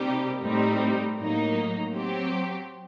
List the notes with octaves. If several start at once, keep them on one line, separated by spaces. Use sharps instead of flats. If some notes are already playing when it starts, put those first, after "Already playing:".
Already playing: C3 G3 A#3 D#4 G4
A2 G3 C4 D#4
A2 F#3 A#3 D#4
F#3 C4 G4